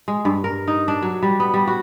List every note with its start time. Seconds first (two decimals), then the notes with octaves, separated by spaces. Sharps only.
0.08 G#3
0.25 G2
0.44 A#4
0.68 D#4
0.88 D4
1.02 F#3
1.23 G3
1.40 B3
1.54 G3
1.67 F#4